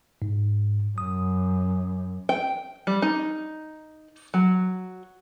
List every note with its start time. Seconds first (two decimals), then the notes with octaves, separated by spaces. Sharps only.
0.22 G#2
0.98 F#2 D#6
2.29 G5
2.87 G3
3.02 D#4
4.34 F#3